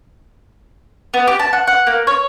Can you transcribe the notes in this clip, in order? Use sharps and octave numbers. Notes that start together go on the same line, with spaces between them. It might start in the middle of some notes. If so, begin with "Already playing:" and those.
B3
G4
A5
F#5
F#5
A#3
C#5